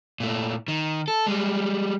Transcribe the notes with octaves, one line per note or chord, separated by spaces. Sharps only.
A#2 A3
D#3
A4
G3 G#3